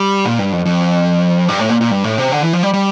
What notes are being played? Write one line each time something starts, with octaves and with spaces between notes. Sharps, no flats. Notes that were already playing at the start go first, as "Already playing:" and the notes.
Already playing: G3
A#2
G2
F2
F2
G2
A2
A#2
A#2
G2
A2
C3
D3
E3
F3
G3
G3